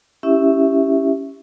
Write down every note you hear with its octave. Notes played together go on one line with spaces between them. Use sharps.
C#4 E4 G4 E5